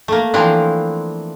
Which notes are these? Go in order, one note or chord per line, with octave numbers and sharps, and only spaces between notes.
A3 A#3
E3 F3 C4 D4 E4